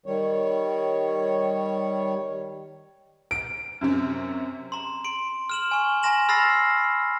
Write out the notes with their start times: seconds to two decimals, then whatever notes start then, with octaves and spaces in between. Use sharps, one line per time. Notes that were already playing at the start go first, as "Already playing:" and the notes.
0.06 D#3 G3 C#5
3.31 D7
3.81 F#2 C3 C#4
4.72 A#5 C6
5.04 C6 D7
5.50 F6 E7 F#7
5.71 G#5 C#6
6.03 G#5 A#5 C6 A#6 E7 F#7
6.28 B5 E6 F6 A6 A#6 C7